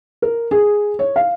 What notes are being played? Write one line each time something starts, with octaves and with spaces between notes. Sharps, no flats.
A#4
G#4
C#5
F5